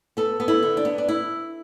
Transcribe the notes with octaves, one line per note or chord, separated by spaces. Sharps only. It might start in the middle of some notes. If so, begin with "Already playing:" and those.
B3 A4
B3
E4
D3
D4
B3
D4
E4